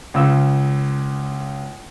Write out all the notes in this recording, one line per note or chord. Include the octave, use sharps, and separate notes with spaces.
C#2 C#3 E6